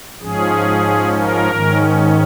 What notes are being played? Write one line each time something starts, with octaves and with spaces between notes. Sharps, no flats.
G#2 F3 C#4 G#4
A#4
G#2 D#3 C#4